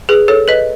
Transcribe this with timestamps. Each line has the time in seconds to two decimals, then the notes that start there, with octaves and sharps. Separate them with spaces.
0.09 G#4 B4
0.28 A4 C#5
0.48 B4 D#5